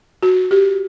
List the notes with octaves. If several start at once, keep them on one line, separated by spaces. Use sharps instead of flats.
F#4
G4